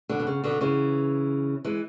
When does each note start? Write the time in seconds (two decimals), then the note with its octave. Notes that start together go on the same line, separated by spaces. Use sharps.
0.09 B2 D3
0.19 B2
0.27 C#3
0.44 B2 D3
0.61 C#3 E3
1.65 E3 G#3